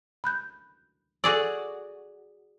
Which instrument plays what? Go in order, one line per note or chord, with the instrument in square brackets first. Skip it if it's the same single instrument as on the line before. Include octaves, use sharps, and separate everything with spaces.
[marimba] B5 F#6 G6
[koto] F#4 G#4 D5 [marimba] A4 D6 E6